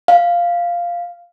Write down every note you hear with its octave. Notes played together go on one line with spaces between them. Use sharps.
F5